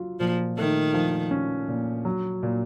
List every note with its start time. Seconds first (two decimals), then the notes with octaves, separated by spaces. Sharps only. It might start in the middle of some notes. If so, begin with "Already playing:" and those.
Already playing: F#3 F4
0.20 A#2 F3
0.58 D#3 A3
0.94 F3
1.31 C#4
1.68 A#2
2.05 F#3
2.43 A#2